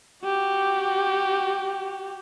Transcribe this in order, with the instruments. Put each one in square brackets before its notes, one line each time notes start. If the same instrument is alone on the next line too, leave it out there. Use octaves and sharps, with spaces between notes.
[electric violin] F#4 G4